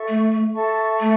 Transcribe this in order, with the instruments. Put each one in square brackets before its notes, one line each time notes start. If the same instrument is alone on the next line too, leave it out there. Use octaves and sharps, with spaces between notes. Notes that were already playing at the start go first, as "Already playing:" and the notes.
Already playing: [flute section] A4 E5 C#6
[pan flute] A3
[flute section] A4 E5 A5 C#6
[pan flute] A3